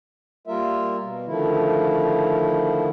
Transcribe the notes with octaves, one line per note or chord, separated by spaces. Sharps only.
G3 A#3 F4 A#4 E5
B2
D3 D#3 F3 A3 E4